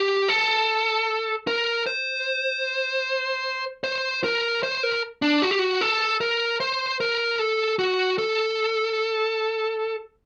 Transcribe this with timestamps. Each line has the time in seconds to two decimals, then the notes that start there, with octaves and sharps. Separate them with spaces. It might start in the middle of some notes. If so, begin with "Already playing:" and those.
Already playing: G4
0.28 A4
1.47 A#4
1.86 C5
3.84 C5
4.24 A#4
4.63 C5
4.83 A#4
5.22 D4
5.42 F#4
5.51 G4
5.59 F#4
5.81 A4
6.21 A#4
6.60 C5
7.00 A#4
7.39 A4
7.79 F#4
8.18 A4